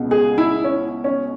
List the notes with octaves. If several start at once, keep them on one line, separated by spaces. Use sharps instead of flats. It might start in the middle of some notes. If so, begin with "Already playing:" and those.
Already playing: C#2 B2
G#4
E4
C#4
C#4